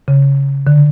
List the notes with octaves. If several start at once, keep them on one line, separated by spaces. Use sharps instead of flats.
C#3
D3